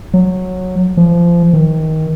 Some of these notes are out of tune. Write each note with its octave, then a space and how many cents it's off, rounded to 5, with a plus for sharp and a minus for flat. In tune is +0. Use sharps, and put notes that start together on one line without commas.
F#3 -10
F3 -25
D#3 +20